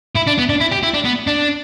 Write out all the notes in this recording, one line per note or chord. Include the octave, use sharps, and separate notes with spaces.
E4
D4
B3
D4
E4
G4
E4
D4
B3
D4